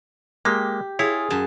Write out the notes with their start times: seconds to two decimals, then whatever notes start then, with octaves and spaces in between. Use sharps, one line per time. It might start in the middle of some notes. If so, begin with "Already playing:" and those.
0.45 G#3 A#3 G4
0.99 E4 F4 G#4 C#5
1.30 F#2 G#5 A5